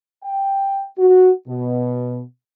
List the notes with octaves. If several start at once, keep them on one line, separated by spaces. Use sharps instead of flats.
G5
F#4
B2